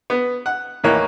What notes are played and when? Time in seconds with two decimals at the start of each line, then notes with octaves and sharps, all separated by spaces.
0.10 B3
0.46 F#5
0.84 D#2 A2 E3 A#3 C#5 F#6